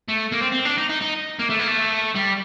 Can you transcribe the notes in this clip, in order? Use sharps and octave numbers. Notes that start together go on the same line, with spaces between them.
A3
A#3
C4
C4
D4
D#4
D#4
D#4
A#3
A3
A#3
A3
G3